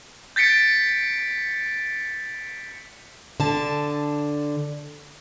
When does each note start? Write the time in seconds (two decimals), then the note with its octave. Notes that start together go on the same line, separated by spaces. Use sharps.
0.36 G6 A6 B6 C#7 D7
3.40 D3 A5